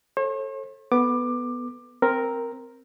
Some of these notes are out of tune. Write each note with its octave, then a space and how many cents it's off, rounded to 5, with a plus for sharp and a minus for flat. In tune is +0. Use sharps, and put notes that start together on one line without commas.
A4 +0 C#5 -45
B3 +0 A4 +0 D6 +15
C4 +0 A#4 +0